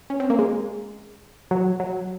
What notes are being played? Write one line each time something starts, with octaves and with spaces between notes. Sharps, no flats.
C#4
C4
A#3
G#3
F#3
F#3